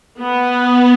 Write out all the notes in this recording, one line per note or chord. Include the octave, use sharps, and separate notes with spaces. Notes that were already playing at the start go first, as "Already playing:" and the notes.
B3